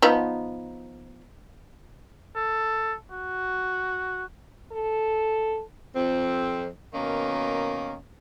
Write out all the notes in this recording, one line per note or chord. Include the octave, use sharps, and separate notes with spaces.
F3 B3 D#4
A4
F#4
A4
F2 C4
B2 D#3 A#3 C#4